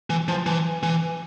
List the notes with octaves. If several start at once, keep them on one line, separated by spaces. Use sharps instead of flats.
E3
F3
E3
E3